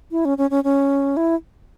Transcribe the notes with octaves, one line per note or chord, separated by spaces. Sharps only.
E4
C#4
C#4
C#4
C#4
E4